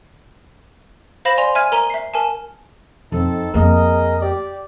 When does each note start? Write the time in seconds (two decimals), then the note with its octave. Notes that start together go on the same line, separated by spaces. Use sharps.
1.25 C5 F5 B5 A#6 E7 F#7
1.37 D5 G#5 C6 F7
1.55 E5 G#5 F6 G#6 D#7
1.72 A#4 A#5 D#7 G7
1.90 E5 C7
2.14 A#4 G#5 A5
3.12 F2 C4 D#4 A4
3.54 F2 A#3 G#4 A#4 D#5
4.22 G4 D5